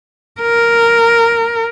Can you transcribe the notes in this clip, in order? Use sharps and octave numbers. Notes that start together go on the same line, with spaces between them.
A#4